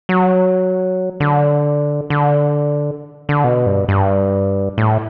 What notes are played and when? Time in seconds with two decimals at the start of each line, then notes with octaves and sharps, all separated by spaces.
0.09 F#3
1.20 D3
2.10 D3
3.29 D3
3.44 B2
3.66 G2
3.89 G2
4.78 A2